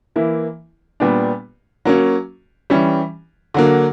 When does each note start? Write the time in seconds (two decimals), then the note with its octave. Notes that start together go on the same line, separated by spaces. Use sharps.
0.16 E3 A#3 E4
1.00 A#2 G3 B3 D4
1.85 F#3 A#3 C#4
2.70 E3 G3 C#4
3.54 D3 F#3 A#3